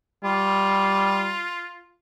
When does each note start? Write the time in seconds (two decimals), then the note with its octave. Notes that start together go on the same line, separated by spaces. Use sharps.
0.24 G3 F4